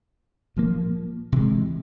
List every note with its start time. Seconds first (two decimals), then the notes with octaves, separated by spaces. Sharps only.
0.57 A#2 F3 A#3
1.32 C3 E3 G#3